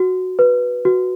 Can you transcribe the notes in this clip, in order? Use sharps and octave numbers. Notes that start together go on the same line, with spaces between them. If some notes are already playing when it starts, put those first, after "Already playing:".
Already playing: F#4
B4
F#4